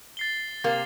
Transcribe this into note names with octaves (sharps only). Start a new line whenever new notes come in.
A6 C7 G7
C3 A#3 A6